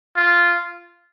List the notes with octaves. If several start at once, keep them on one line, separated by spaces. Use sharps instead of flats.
F4